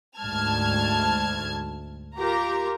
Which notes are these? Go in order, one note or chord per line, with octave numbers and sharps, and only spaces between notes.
D2 G#2 A5 F6 G#6
F4 G4 A#4 A#5